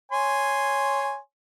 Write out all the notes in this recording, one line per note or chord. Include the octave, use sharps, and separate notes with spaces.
C#5 G#5 C6